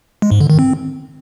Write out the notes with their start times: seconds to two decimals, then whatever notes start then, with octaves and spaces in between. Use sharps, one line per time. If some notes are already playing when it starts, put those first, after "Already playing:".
0.22 G#3
0.31 G#2
0.40 D3
0.50 D#3
0.59 C4